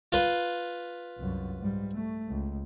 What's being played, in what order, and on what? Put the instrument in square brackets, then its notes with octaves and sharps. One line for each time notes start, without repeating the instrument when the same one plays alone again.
[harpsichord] F4 B4
[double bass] C2 F#2
G#2 G3
A3
C#2